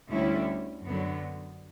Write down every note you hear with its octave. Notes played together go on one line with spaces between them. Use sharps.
D2 D3 G3 C#4 E4
F#2 D3 F#3 B3